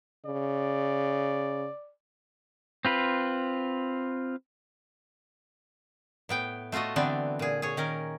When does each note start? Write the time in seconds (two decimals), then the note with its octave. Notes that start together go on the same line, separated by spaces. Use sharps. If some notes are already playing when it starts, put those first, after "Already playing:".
0.26 C#3 D5
2.85 C4 F4 B4
6.29 A2 B3 G5
6.72 A3 F4 F#4 A4 D#5
6.96 D3 E3 B3 C4 D4
7.39 A#2 G#4
7.62 G#4 C#5
7.77 D#3 C#4 A#4